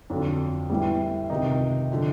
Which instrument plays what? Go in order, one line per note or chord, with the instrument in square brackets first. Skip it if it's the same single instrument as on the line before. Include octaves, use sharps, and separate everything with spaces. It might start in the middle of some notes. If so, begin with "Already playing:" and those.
[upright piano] F2 D3 F#3 D4
A2 E3 G3
C#2 C3 D#3 D#4
D3 F3